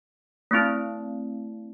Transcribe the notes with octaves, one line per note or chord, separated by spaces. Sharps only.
A3 C4 E4